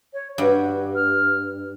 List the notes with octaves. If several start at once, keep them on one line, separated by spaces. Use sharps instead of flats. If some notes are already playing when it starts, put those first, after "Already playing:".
C#5
G2 F#4
F6